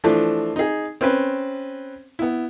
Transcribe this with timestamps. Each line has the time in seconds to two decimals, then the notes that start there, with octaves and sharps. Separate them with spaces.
0.04 E3 F3 A3 D4
0.56 D#4 G#4
1.01 C4 C#4 B4
2.19 B3 E4